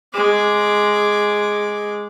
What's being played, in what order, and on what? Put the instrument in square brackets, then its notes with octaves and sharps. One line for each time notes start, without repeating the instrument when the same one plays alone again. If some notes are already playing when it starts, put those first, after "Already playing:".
[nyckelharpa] G#3 D6